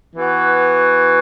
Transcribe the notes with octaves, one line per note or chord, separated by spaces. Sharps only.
E3 B3 F#4